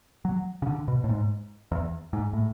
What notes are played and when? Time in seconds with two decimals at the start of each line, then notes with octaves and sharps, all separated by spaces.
0.25 F#3
0.62 C#3
0.67 D3
0.88 B2
1.04 A2
1.09 G#2
1.72 E2
2.13 G#2
2.33 A2